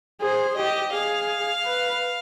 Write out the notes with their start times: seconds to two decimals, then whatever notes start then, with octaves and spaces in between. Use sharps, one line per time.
0.21 G#4 C5
0.57 G4 D#5
0.94 G#4 F5
1.65 B4